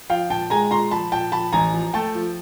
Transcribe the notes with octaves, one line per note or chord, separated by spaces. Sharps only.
F3 F5 G5
A#2 G5 A5
G#3 G#5 A#5
A#2 A#5 C6
F3 A5 B5
A#2 G5 A5
F3 A5 B5
A1 G#5 A#5
F3
A3 G5 A5
F3